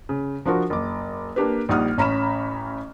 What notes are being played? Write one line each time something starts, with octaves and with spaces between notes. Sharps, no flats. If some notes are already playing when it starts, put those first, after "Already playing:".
C#3
F3 D4 F4 F#4 A#4
F#1 D6
A#3 D4 G4 B4
A#1 G3 D#4 F#5 D#6 F6
A1 C#4 A#5 B5 F6 E7